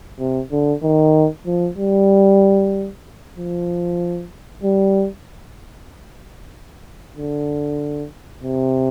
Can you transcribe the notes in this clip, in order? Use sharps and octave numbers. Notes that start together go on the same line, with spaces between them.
C3
D3
D#3
F3
G3
F3
G3
D3
C3